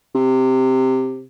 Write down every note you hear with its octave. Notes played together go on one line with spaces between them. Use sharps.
C3